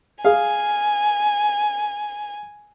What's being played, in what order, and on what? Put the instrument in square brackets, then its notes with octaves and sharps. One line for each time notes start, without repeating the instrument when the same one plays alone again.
[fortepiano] G#4 F5 [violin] G#5